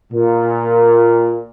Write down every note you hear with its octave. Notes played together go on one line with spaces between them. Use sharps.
A#2